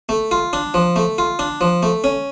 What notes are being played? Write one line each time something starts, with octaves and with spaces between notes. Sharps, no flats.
A3
F4
D4
F3
A3
F4
D4
F3
A3
C#4